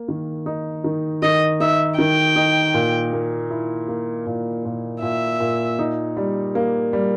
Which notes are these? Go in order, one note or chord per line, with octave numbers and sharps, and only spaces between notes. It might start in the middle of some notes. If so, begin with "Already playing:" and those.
Already playing: A#3
D#3
D#4
D#3
D#3 D#5
D#4 E5
D#3 G5
D#4
A#2
A#3
E4
A#3
A#2
A#2
A#2 E5
A#2
D#4
G3
A#3
G3